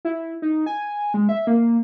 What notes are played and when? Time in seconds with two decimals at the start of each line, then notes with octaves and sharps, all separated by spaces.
0.05 E4
0.42 D#4
0.66 G#5
1.14 G#3
1.29 E5
1.47 A#3